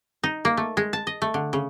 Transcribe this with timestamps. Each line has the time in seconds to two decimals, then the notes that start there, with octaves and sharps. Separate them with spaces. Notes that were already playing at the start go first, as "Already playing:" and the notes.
0.23 D#4
0.45 A#3
0.57 A3
0.77 G#3
0.93 A5
1.07 D#5
1.22 A3
1.34 D3
1.53 C#3